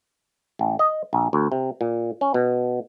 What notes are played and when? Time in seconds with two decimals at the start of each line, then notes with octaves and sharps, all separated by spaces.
0.59 A1
0.79 D#5
1.13 A#1
1.33 D2
1.52 C3
1.81 A#2
2.21 C#4
2.34 B2